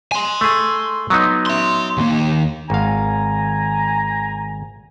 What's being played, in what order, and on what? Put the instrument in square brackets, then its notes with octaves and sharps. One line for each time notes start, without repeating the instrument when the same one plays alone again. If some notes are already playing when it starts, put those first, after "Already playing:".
[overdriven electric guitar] G#5 C6
[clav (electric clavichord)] A3 G#4
F#3 B3 D#4
[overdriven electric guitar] E5 C6
D#2 A#3
[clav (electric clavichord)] G#1 F5 [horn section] G#5 A#5